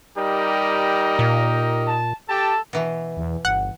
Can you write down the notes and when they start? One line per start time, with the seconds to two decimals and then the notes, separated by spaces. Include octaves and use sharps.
0.18 G3 D#4 G4 A#4
1.19 A#2
1.87 A5
2.30 G4 A4 A5
2.73 B2 E3
3.17 E2
3.45 G1 F#5